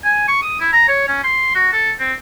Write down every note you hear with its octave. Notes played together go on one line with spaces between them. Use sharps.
G#5
C#6
D#6
E4
A#5
C#5
C#4
C6
F#4
A4
C4